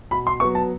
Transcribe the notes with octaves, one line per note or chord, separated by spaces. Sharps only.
B2 B5
C6
F#3 B3 C#6
A5